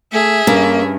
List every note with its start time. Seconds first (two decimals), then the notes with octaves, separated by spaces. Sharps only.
0.12 A3 G#4 E5
0.47 G2 A#3 C#4